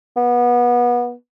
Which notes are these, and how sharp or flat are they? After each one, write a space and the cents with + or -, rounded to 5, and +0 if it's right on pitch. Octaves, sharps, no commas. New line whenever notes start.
B3 -25